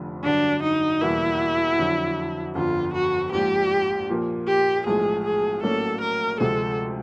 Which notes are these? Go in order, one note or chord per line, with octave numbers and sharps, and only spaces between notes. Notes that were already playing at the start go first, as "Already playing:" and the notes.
Already playing: F1 F2 D3 F3
G2 D3 F#3 D4
D#4
E2 B2 G3 A#3 E4
F2 D3 F#3
G1 F2 D3 F4
F#4
A#1 G#2 F3 G4
A#2 F3 A#3
G4
B1 A2 F3 G#3 G#4
G#4
A#1 A2 F#3 A#3 C#4 A4
A#4
D2 C3 F3 G#3 A4